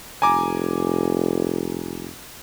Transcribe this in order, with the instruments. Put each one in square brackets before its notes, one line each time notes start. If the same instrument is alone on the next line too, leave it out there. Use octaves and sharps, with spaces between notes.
[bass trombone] F1 [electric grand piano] G#5 A#5 D6